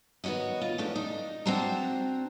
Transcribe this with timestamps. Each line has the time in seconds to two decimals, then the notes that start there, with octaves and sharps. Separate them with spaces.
0.24 D#3 B3 F#4 C#5 D#5
0.62 F4
0.78 E2 A3 C#4 D4
0.96 D#4
1.46 C4 D4 F#4 C5 A5 A#5